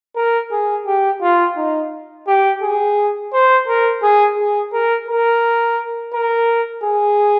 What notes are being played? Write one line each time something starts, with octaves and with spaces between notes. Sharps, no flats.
A#4
G#4
G4
F4
D#4
G4
G#4
C5
A#4
G#4
G#4
A#4
A#4
A#4
G#4